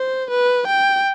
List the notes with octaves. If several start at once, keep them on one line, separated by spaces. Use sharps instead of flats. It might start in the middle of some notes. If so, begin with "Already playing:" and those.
Already playing: C5
B4
G5